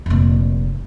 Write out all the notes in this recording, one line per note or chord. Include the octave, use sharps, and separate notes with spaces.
F1 A#2